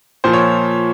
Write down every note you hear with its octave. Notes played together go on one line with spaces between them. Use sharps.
A#2 F3 C5
C#5